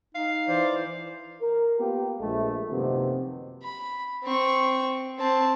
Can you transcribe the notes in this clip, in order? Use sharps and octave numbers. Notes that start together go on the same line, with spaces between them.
D#4 F5
E3 C5 D5
A#4
A#3 B3 F4 G4
A#1 G#3 A3
F#2 C3 D#3 F3 A#3 B3
B5
C4 C#6
C4 A5